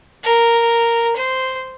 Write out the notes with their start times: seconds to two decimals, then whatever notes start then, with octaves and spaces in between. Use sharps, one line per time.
0.24 A#4
1.16 C5